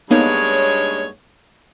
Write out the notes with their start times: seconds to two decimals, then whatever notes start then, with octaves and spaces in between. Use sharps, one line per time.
0.10 G2 G#3 A#3 B3 D#4 C#5